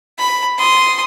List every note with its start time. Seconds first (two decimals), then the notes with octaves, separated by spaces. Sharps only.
0.18 B5
0.58 C6 D#6